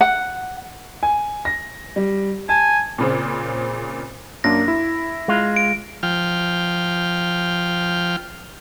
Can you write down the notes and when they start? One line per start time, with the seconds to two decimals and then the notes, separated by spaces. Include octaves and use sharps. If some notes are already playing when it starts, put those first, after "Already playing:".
0.01 F#5
1.03 G#5
1.45 A#6
1.96 G3
2.49 G#5 A5
2.98 A#2 C#3 C4
4.44 F#2 A#3 D4 A#6
4.68 E4
5.28 G#3 F4
5.56 D7
6.03 F3 G5 F6